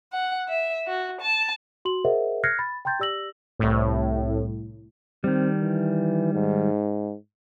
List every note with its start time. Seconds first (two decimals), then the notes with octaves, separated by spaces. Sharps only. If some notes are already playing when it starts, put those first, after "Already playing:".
0.13 F#5
0.49 E5
0.87 F#4
1.21 A5
1.85 F#4 C6 F#7
2.04 G#4 A#4 C5 D#5 E5 F#5
2.44 F6 F#6 G#6 A#6 C7 C#7
2.59 B5 A6
2.85 G5 A#5 C6 G6 A6
3.00 G4 D5 E6 A#6 F#7
3.59 C2 A2
5.24 D#3 G3 C4
5.62 E3
6.34 G#2